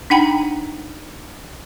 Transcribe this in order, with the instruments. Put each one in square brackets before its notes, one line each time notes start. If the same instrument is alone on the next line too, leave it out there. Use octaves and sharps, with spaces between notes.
[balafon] D4 D#4 F#5 G5 A#5 B5